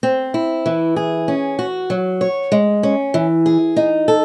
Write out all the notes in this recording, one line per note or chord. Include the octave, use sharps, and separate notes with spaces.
C4
E4
E3
G#4
C#4
F#4
F#3
C#5
G#3
C#4
E3
G#4
D#4
A4